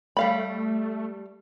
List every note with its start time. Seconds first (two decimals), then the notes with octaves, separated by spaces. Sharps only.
0.17 G3 A3 F5 B5